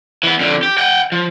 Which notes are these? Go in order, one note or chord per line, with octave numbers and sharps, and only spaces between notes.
E3 B3
F2 D3
G4
F#5 G5
F3